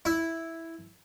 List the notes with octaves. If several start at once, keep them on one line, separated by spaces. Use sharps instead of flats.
E4